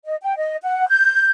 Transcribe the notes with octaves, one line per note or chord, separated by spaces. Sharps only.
D#5
G5
D#5
F#5
G6